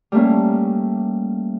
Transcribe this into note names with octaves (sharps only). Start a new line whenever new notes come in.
G3 A3 A#3 C#4